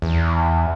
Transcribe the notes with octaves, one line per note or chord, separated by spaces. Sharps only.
E2